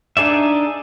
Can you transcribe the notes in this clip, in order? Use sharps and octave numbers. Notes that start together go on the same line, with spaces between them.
D4 D#4 G#4 D5 E5